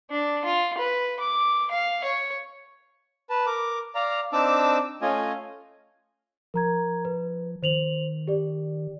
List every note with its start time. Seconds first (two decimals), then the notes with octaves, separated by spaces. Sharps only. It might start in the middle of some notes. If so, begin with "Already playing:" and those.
0.11 D4
0.45 F4
0.78 B4
1.20 D6
1.71 F5
2.04 C#5
3.30 B4 A5
3.47 A#4 D6
3.95 D5 F5 A#5
4.33 C4 D4 D#4 A5 D6 E6
5.02 A3 C#4 F4 D#5 G#5
6.54 F3 A#4 A#5 G#6
7.05 B4
7.63 D#3 C5 F7 F#7
8.27 G4 D5